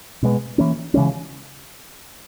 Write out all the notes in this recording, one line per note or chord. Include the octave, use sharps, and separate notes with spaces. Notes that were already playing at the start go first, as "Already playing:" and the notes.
B2 G#3 B3
E3 A#3 C#4
C#3 E3 G#3 C#4